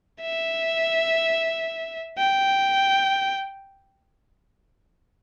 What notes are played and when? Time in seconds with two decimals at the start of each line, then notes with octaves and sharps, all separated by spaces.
0.21 E5
2.18 G5